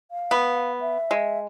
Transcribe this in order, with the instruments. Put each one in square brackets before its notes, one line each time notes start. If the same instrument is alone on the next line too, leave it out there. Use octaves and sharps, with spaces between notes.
[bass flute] F5
[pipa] B3
[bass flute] E5
[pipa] G#3